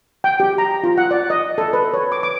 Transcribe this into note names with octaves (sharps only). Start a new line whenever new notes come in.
G5
G4
A#5
F4
F#5
D5
D#5
A4
B4
C#5
D6
D6